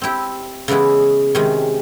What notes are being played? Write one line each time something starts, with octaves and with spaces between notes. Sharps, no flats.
C4 E4 G4
C#3 E3 G#3 B3 E4
C3 D#3 G#3 C#4